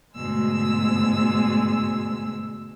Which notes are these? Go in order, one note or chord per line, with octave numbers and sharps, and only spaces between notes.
D2 G#2 B2 G#3 E6